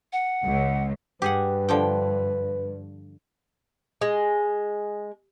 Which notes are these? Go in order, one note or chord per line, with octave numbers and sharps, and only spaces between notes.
F#5
C#2
G2 G4 G#4 B4 F#5
D3 F3 G5
G#3